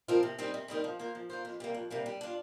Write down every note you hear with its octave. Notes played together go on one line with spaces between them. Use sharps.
F3 C4 F4 A#4
C3
G3 C4 D#4 A#4
C3
G3 C4 D#4 A#4
F3
A#3 F4 C5
F3
A#3 F4 C5
F2
C3 G3 A#3
F2
C3 G3 A#3
G3
D4 F4